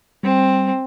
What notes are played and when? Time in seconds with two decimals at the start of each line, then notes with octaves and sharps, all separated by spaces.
0.23 G3 C4